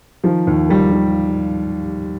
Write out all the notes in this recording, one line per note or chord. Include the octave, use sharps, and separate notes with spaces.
D#3 F3
D#2
D#3 G3
D#3